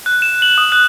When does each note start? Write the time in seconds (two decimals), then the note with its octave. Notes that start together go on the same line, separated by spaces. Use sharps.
0.06 F#6
0.22 E7
0.42 F#7
0.58 D#6
0.72 F#6